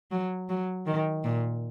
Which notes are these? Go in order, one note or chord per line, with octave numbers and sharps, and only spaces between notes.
F#3
F#3
D#3
A#2